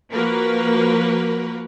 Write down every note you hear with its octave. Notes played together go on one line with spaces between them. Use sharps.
F3 A#3 F#4 A#4 B4